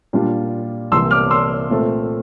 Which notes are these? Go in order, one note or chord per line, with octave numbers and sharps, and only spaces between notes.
A#2 G3 D4 F4
C2 C3 E3 A#3 C6 E6
D6 F6
C6 E6
A#2 A3 C4